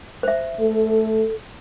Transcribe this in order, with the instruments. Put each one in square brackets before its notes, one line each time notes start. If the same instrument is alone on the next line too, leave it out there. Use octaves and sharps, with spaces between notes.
[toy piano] C5 E5
[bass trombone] A3 [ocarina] A4